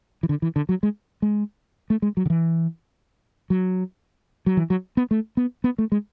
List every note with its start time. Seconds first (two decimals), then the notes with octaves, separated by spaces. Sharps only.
0.23 E3
0.29 D3
0.42 E3
0.56 D3
0.69 F#3
0.83 G#3
1.22 G#3
1.90 A3
2.02 G#3
2.17 F#3
2.26 D3
2.30 E3
3.50 F#3
4.46 F#3
4.57 E3
4.70 F#3
4.97 B3
5.11 A3
5.37 B3
5.64 B3
5.78 A3
5.92 G#3